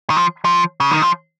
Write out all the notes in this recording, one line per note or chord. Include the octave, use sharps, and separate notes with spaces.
D#3
F3
F3
C#3
D#3
F3